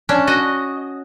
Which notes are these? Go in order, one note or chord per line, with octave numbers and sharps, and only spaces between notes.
C#4 D4
F#4 D#5